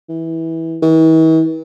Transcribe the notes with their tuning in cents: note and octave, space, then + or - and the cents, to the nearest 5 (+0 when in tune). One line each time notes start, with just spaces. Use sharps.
E3 -15
E3 -45